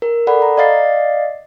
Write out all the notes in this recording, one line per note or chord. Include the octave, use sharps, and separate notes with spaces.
A#4
A4 D5 F#5 B5
A#5
D5 D#5 F5 A6 C7